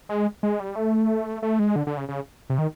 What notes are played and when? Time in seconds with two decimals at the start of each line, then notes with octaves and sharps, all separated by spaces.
0.09 G#3
0.43 G#3
0.60 G3
0.76 A3
1.42 A3
1.59 G#3
1.76 D3
1.87 D3
1.97 C#3
2.08 C#3
2.50 C3
2.58 D#3